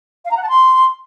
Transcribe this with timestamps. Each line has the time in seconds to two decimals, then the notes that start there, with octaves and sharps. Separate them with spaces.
0.25 F5
0.31 A#5
0.37 F#5
0.43 A5
0.49 C6